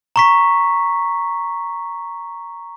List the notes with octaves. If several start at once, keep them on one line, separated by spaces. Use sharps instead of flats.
A#5 C#6 B6